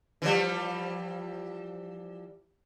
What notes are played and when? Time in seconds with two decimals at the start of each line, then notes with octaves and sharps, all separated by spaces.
0.22 E3 F3 G3